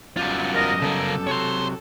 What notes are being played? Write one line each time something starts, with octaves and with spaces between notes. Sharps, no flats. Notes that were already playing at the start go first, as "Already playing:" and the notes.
F#2 F#3 G3 B3 F4
A#4 D#5
C#3 A4 A#4
C3 F#3 C#5 C6